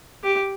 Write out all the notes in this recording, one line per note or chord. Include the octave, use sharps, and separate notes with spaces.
G4